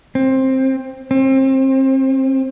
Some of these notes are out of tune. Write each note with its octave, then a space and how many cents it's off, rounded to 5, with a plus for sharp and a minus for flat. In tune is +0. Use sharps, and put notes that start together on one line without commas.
C4 +15
C4 +30